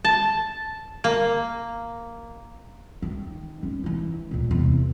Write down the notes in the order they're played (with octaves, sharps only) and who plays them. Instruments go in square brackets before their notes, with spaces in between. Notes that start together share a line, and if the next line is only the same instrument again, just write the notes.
[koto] A5
A#3
[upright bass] D#3
D3 C#4
E3 E4
D2 A#2
E2 C3